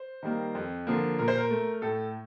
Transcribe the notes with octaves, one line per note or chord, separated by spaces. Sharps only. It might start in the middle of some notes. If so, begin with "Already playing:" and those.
Already playing: C5
D#3 G3 A#3
F2
D3 F3 A#3
A#2 A#4
C5
A#4
A3
A2 A4